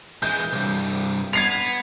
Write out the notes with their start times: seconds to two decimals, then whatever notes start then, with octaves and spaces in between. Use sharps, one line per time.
0.22 E3 G#3 G6
0.53 C2 G2
1.33 B3 G#6 C7 F7